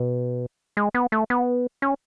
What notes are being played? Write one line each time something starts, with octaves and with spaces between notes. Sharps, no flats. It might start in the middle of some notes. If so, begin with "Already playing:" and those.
Already playing: B2
G#3
B3
A3
B3
C#4